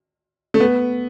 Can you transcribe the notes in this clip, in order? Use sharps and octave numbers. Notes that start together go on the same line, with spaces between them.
A3
B3